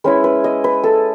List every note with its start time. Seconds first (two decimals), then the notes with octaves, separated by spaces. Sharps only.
0.04 G#3 C#4 E4 B4
0.24 B4
0.44 D#5
0.64 B4
0.84 A4